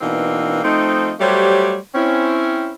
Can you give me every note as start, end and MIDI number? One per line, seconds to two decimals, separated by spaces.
0.01 0.61 47
0.01 0.61 52
0.01 0.61 58
0.01 0.61 60
0.01 0.61 62
0.01 0.61 63
0.64 1.13 53
0.64 1.13 57
0.64 1.13 60
0.64 1.13 63
1.20 1.76 54
1.20 1.76 55
1.20 1.76 57
1.20 1.76 67
1.20 1.76 72
1.20 1.76 73
1.95 2.73 60
1.95 2.73 61
1.95 2.73 64